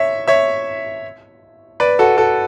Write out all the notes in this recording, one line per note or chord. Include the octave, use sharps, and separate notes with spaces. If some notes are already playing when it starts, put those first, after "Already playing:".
Already playing: C#5 E5
C#5 E5
B4 D5
F#4 A4
F#4 A4